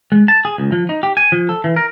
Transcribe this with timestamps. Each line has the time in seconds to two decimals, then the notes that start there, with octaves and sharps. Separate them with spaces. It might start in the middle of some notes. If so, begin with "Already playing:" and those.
0.12 G#3
0.28 A5
0.45 G#4
0.58 C#2
0.72 F3
0.89 D#4
1.03 G4
1.17 G#5
1.32 F3
1.49 A4
1.64 E3
1.76 A#4